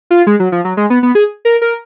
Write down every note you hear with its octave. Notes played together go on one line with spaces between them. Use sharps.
F4
G#3
F#3
F3
F#3
G#3
B3
B3
G#4
A#4
A#4